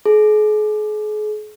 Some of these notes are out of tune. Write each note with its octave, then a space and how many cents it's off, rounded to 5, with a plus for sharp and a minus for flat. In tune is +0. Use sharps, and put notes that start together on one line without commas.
G#4 +40